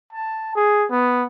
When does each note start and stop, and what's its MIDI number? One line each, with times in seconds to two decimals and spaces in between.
0.13 0.54 81
0.56 0.86 68
0.91 1.24 59